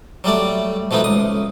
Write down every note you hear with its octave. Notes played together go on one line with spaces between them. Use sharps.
F#3 G3 A3 D5
B2 F3 A3 B3 D#4
C#2 D#6